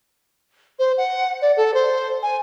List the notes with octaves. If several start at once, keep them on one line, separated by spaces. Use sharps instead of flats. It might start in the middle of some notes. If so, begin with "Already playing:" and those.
C5
F#5
D5
A4
C5
G#5